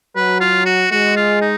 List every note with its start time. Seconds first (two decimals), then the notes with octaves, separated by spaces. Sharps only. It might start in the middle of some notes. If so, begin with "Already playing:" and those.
0.16 F#3 B4
0.41 F4
0.66 F#4
0.91 G#3 F#4
1.17 F4
1.41 D#4